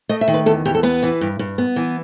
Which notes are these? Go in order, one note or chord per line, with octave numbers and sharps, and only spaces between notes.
A3 D#5
E5
D#3
B4
E2 A4
E2 G4
A4
B3 B4
E3
G2
G2
B3
E3